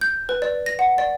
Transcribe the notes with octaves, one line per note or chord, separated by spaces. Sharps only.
G6
B4
D5
A#6
F#5
D5